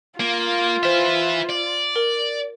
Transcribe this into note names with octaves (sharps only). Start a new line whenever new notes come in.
A#3 F4
B4 C5 E5 F6
D5
A#4